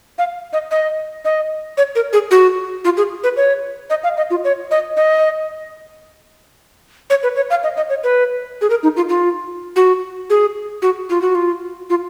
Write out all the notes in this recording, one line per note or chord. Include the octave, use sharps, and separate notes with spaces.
F5
D#5
D#5
D#5
C#5
A#4
G#4
F#4
F4
G#4
B4
C#5
D#5
F5
D#5
F4
C#5
D#5
D#5
C#5
B4
C#5
F5
D#5
D#5
C#5
B4
G#4
A#4
D#4
F4
F4
F#4
G#4
F#4
F4
F#4
F4
F4